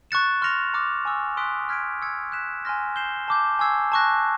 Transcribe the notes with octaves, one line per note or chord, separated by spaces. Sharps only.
C#6 F#6 A6 C#7 E7
C6 F6 A#6 C#7 F7
A#5 D6 F6 A6 C#7
G#5 C#6 E6
C6 D#6 F#6 B6 D7
F6 G#6 B6 D7
E6 G#6 C#7
F#6 B6 E7
G#5 C6 F6 A#6
G6 C7 E7 G7
A5 D6 G6
G#5 C#6 E6 G#6 C7
A5 C#6 F#6 A#6